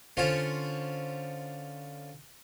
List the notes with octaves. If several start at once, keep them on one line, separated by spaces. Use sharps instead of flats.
D3 C#4 F4 C5 C#5